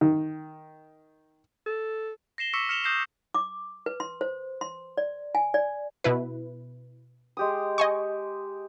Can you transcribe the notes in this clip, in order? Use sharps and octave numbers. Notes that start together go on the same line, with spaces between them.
D#3
A4
A#6 C7 E7 G7
C#6 D6 E6 B6 C#7 E7
F6 C#7 E7 F7 G7
D#6 F6 G6 A#6 C7 E7
D6
B4
C6
C5
C6
D5
G#5
D5
B2 E4 B4
G#3 G4 D#6
D#5 G#5 C#6